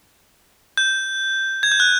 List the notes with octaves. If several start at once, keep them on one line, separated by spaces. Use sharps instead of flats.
G6
G#6
G6
F#6